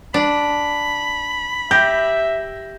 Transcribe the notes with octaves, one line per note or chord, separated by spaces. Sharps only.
D4 B5
G4 E5 G6 A#6